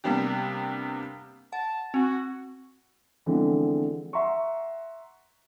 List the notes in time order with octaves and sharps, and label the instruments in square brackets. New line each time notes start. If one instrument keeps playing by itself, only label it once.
[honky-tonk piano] C3 G3 A#3 B3 D4 G4
[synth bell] F#5 [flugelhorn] A5
[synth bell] C4 [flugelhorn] F#4
[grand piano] D3 E3 F3 G#3 B3 C4
E5 F#5 A#5 C6 C#6